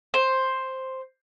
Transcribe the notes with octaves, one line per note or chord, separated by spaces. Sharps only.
C5